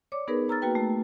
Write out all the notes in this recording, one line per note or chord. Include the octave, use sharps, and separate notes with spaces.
C#5 D5 D6
B3 D#4 G#4 A#4 B4 C#5
C#5 A#5 E6 F6 A6
A#3 F#4 B4 G5
A3